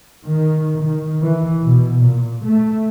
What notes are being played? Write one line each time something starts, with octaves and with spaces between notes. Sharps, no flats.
D#3
D#3
E3
B2
A#2
A3